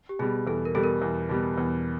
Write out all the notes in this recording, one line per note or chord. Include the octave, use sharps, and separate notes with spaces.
G4
B2 G3 G#4
E2 A4
A#4
B2 G3 A4
A#4
E2
B2 G3
E2